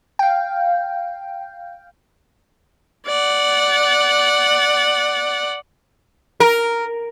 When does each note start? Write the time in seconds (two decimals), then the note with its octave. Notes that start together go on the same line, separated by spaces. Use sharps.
0.19 F5 G5
3.06 D5 F#5
6.40 A#4